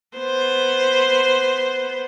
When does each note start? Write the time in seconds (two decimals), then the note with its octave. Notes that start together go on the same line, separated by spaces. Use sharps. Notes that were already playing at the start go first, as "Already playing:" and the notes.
0.18 B3 C5